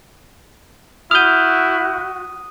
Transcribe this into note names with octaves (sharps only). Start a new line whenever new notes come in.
E4 F#4 D#6 F6 G6 D#7